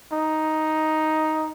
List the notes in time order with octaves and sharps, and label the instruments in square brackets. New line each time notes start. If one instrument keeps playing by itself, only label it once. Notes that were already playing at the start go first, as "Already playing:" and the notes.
[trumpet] D#4